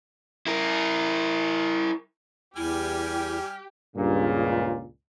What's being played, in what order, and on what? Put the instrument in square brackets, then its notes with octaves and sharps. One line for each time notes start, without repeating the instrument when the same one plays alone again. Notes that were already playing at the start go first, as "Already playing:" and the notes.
[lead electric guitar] E4 A#4
[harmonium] E2 [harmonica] G3 G#5 F6 [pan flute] E4 [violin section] G4
[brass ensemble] C#2 G2 A#2 C#3